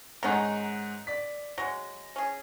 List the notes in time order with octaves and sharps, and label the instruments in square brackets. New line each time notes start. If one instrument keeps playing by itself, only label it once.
[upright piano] G#2 F#5 A#5 [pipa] D#3 C#4 D#4
[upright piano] D5 B6
[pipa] F#3 G#3 [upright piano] A#6
[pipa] C#4 G#4